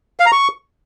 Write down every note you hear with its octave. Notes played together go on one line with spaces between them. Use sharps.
F5
A#5
C#6